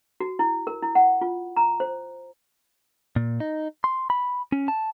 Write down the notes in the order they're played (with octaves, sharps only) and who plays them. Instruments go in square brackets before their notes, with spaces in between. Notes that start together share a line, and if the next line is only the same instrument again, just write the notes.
[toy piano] F#4
E4
A#4
E4
F#5
F4
A#5
C5
[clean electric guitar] A#2
D#4
C6
B5
C#4
A5